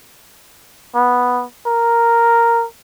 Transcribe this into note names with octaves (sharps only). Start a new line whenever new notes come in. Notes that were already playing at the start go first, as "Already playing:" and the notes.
B3
A#4